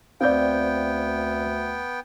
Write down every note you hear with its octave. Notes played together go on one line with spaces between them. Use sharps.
D2 B3 C4 D5 F5 G5 G6